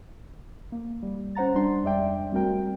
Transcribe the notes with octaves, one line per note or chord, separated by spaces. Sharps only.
A#3
G3
C#4 C5 F#5 A#5 A6
G3 D4 C6
F2 G3 G#3 D5 E5 G5
G3 A3 C4 F#4 A#4 G5